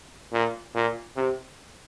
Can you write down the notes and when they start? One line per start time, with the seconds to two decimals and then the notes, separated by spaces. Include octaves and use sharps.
0.33 A#2
0.75 A#2
1.16 C3